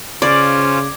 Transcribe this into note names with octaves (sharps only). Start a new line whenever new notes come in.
C#3 C#4 F4 C5 D5 D6 G#6 D7